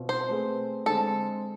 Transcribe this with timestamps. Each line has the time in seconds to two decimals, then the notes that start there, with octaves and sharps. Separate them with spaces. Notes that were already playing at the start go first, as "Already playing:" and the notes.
Already playing: B2 C4 F4
0.09 C5
0.29 A3 C4 G#4 B4
0.86 D3 G#3 C4 G#4 A4